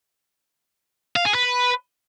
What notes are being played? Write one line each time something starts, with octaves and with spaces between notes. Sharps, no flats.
F5
G#4
B4